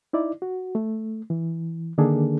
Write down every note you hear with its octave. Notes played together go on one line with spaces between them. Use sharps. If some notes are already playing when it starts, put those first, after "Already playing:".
D#4 E4 D5
F#4
A3
E3
D3 D#3 A#3 D4 G#4 A4